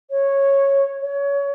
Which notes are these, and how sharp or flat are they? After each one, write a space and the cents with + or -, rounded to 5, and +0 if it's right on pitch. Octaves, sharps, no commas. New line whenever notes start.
C#5 -10
C#5 +25